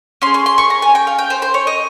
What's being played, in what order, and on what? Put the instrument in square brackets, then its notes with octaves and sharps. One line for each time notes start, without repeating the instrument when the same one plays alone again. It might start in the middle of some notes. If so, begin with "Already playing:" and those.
[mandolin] C#4 C6
G#4
C6
C6
C#6
A#5
G#5
G5
F5
G5
C5
C5
C#5
D#5